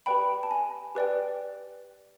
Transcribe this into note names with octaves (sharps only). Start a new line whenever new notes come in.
G4 B4 D5 G5 B5
A5
G#5
G4 B4 D5 G5